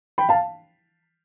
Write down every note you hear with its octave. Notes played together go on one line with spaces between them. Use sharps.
G5 B5
F5 A5